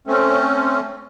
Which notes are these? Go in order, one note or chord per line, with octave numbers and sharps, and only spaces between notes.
A3 C4 C#4